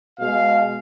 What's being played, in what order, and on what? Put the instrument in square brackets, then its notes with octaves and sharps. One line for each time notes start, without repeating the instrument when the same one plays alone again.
[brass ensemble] B2 G#3 F5